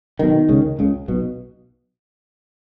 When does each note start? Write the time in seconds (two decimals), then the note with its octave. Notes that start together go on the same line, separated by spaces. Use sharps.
0.19 B1 B2 D#3
0.49 C#2 C#3
0.79 C#2 C#3
1.08 B1 B2